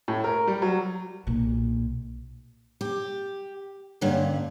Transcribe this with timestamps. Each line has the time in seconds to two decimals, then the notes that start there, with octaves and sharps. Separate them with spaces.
0.08 A2
0.24 A#4
0.47 G3
0.62 F#3
1.27 B1 A#2
2.81 G4
4.01 G2 D3 A#3 C#4 F#5